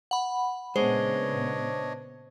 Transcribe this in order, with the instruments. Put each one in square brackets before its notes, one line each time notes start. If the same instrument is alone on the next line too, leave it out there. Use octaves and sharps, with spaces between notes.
[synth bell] F#5 B5
[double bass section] A#2 C#3 B3 [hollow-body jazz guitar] G#3 [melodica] D4 C#5 D#5 [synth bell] C5